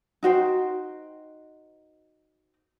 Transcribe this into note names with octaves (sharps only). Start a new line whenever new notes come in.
D#4 F#4 C5 G5